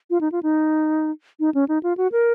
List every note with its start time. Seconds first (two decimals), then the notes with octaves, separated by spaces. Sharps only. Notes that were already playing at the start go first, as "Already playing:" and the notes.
0.10 F4
0.21 D#4
0.32 F4
0.43 D#4
1.40 D#4
1.55 C#4
1.68 D#4
1.83 F4
1.97 F#4
2.12 A#4